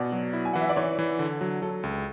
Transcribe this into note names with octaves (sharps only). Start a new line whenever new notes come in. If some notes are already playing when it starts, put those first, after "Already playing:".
Already playing: B2 D5 F#5 G#5
F#3
E4
G#5
E3 F#5
E5
D5
E3 C#5
E3
D3
F#3
F#3 A4
C#2